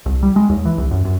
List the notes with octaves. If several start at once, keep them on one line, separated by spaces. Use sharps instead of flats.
C2
G3
G#3
D#2
E3
C2
F#2
F#2